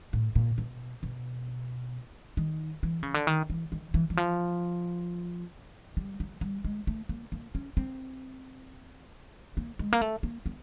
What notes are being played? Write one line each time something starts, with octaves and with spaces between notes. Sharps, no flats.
A2
A#2
B2
B2
D#3
E3
C#3
D3
D#3
E3
D#3
E3
E3
F3
G3
F#3
G3
G#3
A3
A#3
A#3
C#4
C4
A#3
G#3
A#3
A3
A#3
B3